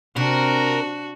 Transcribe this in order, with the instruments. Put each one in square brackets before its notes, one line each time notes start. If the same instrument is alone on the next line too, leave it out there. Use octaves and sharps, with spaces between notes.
[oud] C3 [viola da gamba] D4 F#4 [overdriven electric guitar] A#4